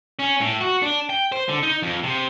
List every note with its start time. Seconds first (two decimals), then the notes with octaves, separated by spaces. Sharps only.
0.19 C#4
0.41 A2
0.61 F#4
0.82 D4
1.10 G5
1.32 C5
1.49 D3
1.63 D#4
1.83 F2
2.03 C3